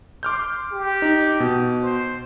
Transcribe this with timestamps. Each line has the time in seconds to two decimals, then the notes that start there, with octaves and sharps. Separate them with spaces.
0.23 C6 D6 F6 G6
0.72 G4
1.02 D#4
1.40 B2
1.82 C5